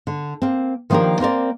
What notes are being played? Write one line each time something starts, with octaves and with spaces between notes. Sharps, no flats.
D3
A#3 C4
D#3 F3 A#3 D4 G4 A#4
A#3 C4 A#4 D5